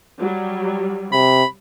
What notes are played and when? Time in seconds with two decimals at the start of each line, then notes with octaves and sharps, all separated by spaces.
0.19 F#3 G3
1.12 C3 B5